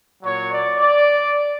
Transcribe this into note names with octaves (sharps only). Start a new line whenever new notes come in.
A#2 F#3 C#5
D5
D5